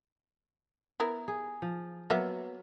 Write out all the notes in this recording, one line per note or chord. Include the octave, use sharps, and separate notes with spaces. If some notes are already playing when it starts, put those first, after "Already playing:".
B3 E4 A#4
G#4
F3
F#3 A#3 B3 E5